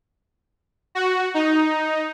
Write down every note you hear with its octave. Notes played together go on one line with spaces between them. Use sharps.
F#4
D#4